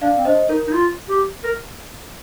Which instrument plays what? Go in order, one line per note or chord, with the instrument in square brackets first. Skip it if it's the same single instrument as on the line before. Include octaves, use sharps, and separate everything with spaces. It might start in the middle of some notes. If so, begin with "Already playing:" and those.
[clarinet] D4 [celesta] D5 F5
[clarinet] C4
[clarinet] D4 [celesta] C5 D#5
[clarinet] D#4 [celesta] A#4
[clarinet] D#4
F4
G4
A#4